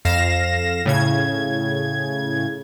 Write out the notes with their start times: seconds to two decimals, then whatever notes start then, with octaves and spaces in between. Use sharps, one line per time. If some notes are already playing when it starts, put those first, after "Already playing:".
0.05 F2 F5 A#6 E7
0.86 A2 C#3 G#6